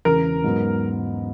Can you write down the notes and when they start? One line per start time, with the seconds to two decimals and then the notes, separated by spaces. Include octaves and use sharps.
0.05 E1 E2 C#3 A#4
0.44 G#2 F#3 B3